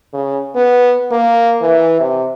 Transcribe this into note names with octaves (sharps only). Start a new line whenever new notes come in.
C#3
B3
A#3
E3
C3